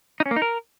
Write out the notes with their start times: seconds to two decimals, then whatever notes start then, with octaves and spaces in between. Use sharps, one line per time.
0.20 D#4
0.26 C#4
0.31 A#3
0.36 D#4
0.42 A#4